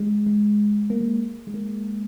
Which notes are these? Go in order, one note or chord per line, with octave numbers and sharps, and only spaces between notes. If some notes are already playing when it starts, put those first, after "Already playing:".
Already playing: G#3
G#3
A#3
G#3
G#3
A#3